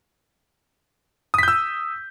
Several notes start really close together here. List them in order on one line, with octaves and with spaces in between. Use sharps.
D#6 B6 G6 E6